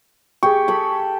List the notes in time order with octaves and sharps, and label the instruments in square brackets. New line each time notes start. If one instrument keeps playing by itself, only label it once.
[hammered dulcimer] G4 [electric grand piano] G#4 C#6
[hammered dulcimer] A4 B5